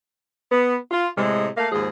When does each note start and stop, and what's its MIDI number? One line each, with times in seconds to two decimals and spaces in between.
0.51 0.75 59
0.91 1.07 65
1.16 1.47 45
1.16 1.47 48
1.16 1.47 56
1.57 1.68 57
1.57 1.68 58
1.57 1.68 77
1.72 1.88 39
1.72 1.88 44
1.72 1.88 53
1.72 1.88 56
1.72 1.88 68